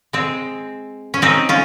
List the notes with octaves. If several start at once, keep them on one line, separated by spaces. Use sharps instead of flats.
G#3 C4
C#4
C4 D#4
C#4 F4